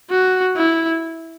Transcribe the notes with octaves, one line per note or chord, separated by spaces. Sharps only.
F#4
E4